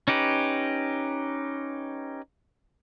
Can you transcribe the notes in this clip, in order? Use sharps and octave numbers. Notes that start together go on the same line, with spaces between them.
C#4 D#4 G4 B4